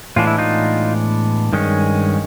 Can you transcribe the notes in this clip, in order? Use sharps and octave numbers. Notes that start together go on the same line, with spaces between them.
A2 E3 G#3 B3 D4 F4
E4
D#4 F4
G2 D#3 G#3 C#4